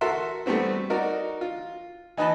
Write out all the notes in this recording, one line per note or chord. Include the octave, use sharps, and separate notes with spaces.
F#4 A4 A#4 E5 A5 C6
G3 A3 B3 C4 F#4
D#4 F#4 A#4 D5
F4
E3 D#4 B4 D#5 A5 B5